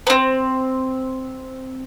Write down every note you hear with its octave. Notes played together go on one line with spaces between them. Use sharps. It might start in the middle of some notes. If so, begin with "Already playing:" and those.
B3 C4